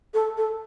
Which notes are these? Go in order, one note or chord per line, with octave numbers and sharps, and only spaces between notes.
A4
A4